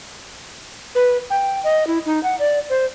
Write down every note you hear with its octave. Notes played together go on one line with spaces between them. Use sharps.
B4
G5
D#5
E4
D#4
F#5
D5
C5